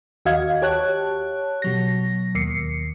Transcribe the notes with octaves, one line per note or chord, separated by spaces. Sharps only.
D#2 F#4 D#5 F5 G#6
G4 C#5 A5 F#6
B2 F#3 A#6
D#2 C7 C#7